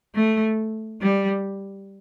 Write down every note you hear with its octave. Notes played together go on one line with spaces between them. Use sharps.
A3
G3